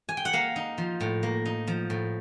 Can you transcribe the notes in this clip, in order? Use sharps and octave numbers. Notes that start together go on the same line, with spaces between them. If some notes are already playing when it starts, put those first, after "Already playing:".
G#5
G5
F#5
A#3 F5
D#4
F3
A2
A#3
D#4
F3
A2